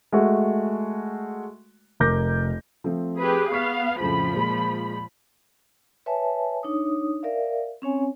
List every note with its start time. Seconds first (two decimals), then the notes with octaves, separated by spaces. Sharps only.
0.12 G#3 A3 F#4
2.00 F1 A#4 D6 G6 A#6
2.84 F3 A3 C4
3.20 G4 G#4 B4
3.52 B3 F5 C#6 F6 B6
4.00 F2 A2 C#3 F3 B5
4.33 A#2 G#3
6.06 B4 C#5 E5 G#5 A5
6.63 D4 D#4 C#5 D#6
7.23 A#4 D5 E5 F5
7.82 C4 C#4 C#5 G#5